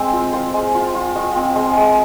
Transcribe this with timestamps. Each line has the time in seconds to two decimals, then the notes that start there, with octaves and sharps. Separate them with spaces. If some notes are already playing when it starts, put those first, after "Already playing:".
Already playing: G#3 C4
0.13 F4
0.33 F4 C5
0.54 G#3
0.75 F4
0.94 F4
1.15 F4 D#5
1.36 C4
1.55 G#3
1.77 G#3